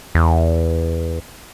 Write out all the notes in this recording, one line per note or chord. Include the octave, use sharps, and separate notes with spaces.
E2